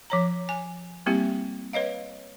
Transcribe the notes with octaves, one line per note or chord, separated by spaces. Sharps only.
F3 C#5 A#5
G#5
G3 A#3 C4 E4 G4
B4 C#5 D#5 F5